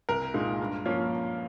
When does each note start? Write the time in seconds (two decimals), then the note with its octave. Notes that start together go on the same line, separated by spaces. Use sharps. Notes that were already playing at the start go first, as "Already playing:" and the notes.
0.09 C2 A#4
0.34 A#2 G#3 D#4
0.60 G2
0.86 F3 A#3 C#4 F4